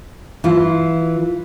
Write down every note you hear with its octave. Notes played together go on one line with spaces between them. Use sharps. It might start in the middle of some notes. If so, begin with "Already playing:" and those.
E3 F4